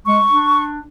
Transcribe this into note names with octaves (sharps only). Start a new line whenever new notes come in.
G#3 C#6
D4